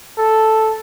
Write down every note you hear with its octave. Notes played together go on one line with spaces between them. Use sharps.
A4